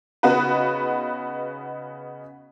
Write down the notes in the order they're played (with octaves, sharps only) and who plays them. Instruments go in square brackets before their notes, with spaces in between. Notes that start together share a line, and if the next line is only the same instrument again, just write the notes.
[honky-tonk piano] C#3 B3 D#4 F#4 B4